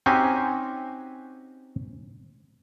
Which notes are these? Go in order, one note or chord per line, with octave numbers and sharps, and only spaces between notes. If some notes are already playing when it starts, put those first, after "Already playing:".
C4 C#4 D#4 F#4 G4 G#5